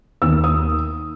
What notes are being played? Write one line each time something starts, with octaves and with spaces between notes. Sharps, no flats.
D#2 E6
D#6